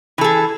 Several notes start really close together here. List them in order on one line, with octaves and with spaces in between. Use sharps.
E3 A4 G#4